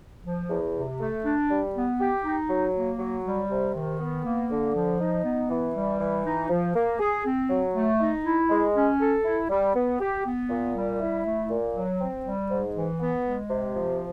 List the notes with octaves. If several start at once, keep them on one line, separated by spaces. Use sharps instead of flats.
F3
E2
C3
A3
D4
G3
B3
G4
D#4
F#3
A#3
F#3
G3
C3
D#3
B3
A#3
D3
F3
D#4
B3
E3
G3
E3
D#4
F3
A#3
G#4
C4
F#3
A3
D#4
E4
G#3
C#4
A4
E4
G3
B3
G4
B3
A#2
G3
E4
A3
A#2
F#3
C4
G3
G#2
E3
B3
G#3
C3
F3